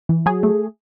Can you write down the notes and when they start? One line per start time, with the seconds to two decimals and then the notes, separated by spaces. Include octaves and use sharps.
0.09 E3
0.26 F#3 G#4
0.43 A3